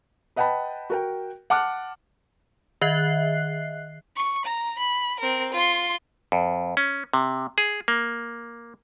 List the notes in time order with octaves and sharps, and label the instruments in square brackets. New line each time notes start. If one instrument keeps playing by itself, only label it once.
[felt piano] B4 D#5 F#5 G5 A5 B5
F#4 A#4 G5
F#5 A5 D6 F6 F#6
[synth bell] D#3 D#5 E5 F#6 C7
[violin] C#6
A#5
B5
C4 A#4
F4 C6
[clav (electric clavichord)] F2
C#4
C3
G#4
A#3